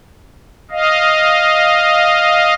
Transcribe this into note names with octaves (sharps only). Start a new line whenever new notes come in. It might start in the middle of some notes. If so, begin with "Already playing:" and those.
D#5 F5